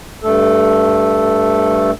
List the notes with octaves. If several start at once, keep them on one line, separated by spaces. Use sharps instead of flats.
G2 A3 A4